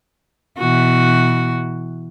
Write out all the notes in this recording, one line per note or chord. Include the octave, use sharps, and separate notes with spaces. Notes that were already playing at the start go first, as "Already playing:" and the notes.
B2 E3 F#4